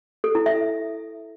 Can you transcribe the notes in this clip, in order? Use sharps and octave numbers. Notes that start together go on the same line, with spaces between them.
A4
E4
E5